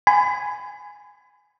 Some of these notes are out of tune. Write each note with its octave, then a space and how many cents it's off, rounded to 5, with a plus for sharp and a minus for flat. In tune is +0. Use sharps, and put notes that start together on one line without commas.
G#5 -5 B5 +30